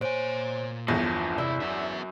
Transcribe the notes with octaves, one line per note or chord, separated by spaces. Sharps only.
A#2 C5 C#5 G#5 D7
G1 E2 D3 F3 A#6
C3 E4 D5 E6
F#2 B3 E5